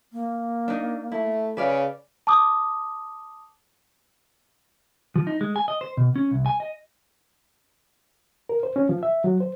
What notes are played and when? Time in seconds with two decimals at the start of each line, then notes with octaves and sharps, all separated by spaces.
0.13 A#3
0.68 D4 D#4
1.12 A3 E4
1.57 C#3 B4 D5 F5
2.27 A5 D6 D#6
5.16 F3
5.27 D#4
5.41 G#3
5.56 G#5
5.68 D#5
5.81 C5
5.97 B2
6.16 C#4
6.31 C2
6.46 G#5
6.60 D#5
8.49 A#4
8.63 C5
8.76 C#4
8.89 F3
9.03 E5
9.24 F#3
9.41 C5